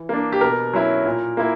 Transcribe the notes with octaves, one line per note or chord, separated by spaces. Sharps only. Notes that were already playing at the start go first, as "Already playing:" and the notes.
Already playing: E3
A#3 D4
G4
B2 A#4
F#3 C#4 E4
A#2
A#3 E4